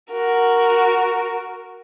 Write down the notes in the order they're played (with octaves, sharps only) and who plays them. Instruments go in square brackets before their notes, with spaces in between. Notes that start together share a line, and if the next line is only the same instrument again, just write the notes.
[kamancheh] F#4 A#4